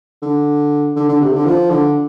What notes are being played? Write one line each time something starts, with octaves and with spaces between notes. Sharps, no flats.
D3
D3
D3
C3
D3
F3
D3